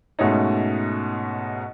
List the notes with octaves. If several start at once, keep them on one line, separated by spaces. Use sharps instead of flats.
G#2 B2 A3 C#4 D#4